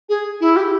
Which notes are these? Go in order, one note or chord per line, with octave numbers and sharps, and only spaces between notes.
G#4
E4
G4